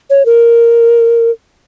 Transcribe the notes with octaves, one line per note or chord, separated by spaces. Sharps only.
C#5
A#4